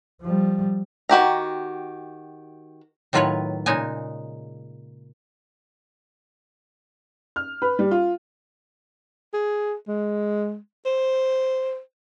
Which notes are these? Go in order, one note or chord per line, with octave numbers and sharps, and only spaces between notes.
F3 G3
D#3 F#4 G4 A#5
A2 D#3 F#3 F4 B4 C#5
A#2 C#3 G#3 D#4 G#5
F6
B4
G3
F4
G#4
G#3
C5